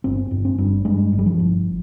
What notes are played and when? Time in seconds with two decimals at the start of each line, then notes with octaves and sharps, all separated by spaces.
0.04 G1 C4
0.31 G1
0.45 C4
0.58 G2
0.85 G2 G#3
1.13 G1
1.19 G3
1.26 F3
1.39 G1